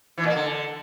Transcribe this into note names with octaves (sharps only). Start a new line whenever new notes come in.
E3
A#2
A#3
D3